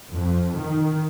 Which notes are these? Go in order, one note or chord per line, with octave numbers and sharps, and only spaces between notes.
F2
D#3